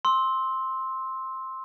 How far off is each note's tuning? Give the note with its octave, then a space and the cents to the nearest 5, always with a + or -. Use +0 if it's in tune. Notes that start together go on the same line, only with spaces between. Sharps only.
C6 +10 E6 -20